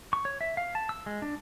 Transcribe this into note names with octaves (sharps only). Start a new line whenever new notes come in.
C#6
C#5
E5
F5
A5
E6
G#3
D4